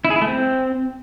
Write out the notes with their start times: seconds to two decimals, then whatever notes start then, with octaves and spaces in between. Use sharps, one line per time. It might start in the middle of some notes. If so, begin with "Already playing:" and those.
0.05 E4
0.10 G#4
0.16 E4
0.22 A3
0.27 C4